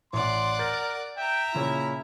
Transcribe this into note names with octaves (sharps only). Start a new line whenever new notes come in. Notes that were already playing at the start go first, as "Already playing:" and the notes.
A1 D5 F#5 C6
A#4 G6 A6 F#7
E5 G5 A#5
A#2 C#3 C#4 E4